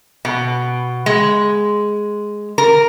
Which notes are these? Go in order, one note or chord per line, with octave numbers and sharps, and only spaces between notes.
B2
G#3
A#4